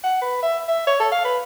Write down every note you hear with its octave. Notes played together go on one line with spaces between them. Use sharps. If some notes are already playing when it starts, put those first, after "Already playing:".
F#5
B4
E5
E5
C#5
A4
F5
B4